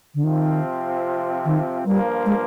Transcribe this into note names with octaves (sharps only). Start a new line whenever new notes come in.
D3
C3 D#3 F3 C4 F4
D#3
G2 F3 G3 A#3 F4
G#3